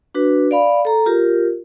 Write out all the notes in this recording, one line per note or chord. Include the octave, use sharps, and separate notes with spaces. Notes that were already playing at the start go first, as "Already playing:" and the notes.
D4 F#4 B4
D5 F5 B5
A4 A#5
F4 G4 A#4